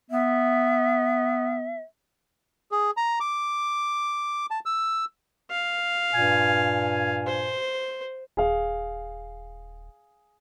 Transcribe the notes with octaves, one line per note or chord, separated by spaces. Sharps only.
B3 E5
G#4
A#5
D6
A5
E6
F5
G2 A#2 G#5
C5
D#1 G#4 F5